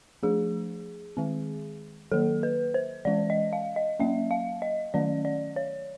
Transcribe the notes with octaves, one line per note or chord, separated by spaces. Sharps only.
F3 A3 D4 G#4
D#3 G#3 C4
D#3 F#3 A#3 A4
B4
C5
E3 G#3 C#4 D5
D#5
F5
D#5
F#3 A#3 C#4 E5
F5
D#5
D#3 F#3 A3 C#4 D5
D5
C#5